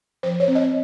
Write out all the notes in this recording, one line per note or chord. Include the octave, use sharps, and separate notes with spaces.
F3 C5
C#5
C4
D#5